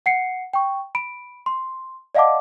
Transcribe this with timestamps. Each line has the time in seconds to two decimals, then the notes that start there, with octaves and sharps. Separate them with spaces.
0.06 F#5 C7 C#7
0.53 G5 C#6
0.95 B5 D7
1.46 C6
2.15 D5 D#5 F5 F#5 A5 D6